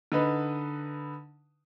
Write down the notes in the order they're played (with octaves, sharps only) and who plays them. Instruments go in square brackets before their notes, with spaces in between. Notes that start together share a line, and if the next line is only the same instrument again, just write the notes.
[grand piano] D3 D#4 B4